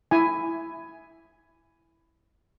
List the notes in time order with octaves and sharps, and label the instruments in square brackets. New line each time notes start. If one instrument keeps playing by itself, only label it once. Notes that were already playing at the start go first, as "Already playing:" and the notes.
[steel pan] E4 G#5